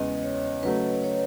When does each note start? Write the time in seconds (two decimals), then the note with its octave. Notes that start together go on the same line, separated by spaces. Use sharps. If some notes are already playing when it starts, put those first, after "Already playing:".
Already playing: E2 C#3 G#3 D#5
0.23 C#5
0.63 C#3 F#3 A3 B4
1.04 C#5